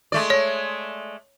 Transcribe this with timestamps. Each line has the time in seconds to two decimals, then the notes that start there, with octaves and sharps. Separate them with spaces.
0.12 G#3 A3 D5
0.30 C#5